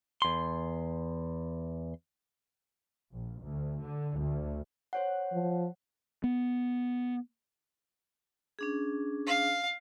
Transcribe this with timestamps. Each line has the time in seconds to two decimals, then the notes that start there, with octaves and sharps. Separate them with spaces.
0.22 E2 C6
3.12 A#1
3.42 D2
3.81 D3
4.19 D2
4.93 C5 C#5 F#5
5.33 F3
6.24 B3
8.59 C#4 D4 G#4
9.26 F5